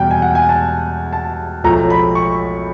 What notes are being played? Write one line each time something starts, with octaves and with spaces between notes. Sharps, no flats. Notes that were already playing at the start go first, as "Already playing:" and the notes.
Already playing: E2 B2 G3 G5
G#5
F#5
G#5
A5
A5
B1 A2 F3 A3 A#5
B5
C#6